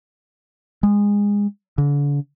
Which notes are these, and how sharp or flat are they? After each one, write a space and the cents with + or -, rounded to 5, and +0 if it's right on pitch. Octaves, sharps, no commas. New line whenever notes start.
G#3 -25
D3 -40